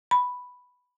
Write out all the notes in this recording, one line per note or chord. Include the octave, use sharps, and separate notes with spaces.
B5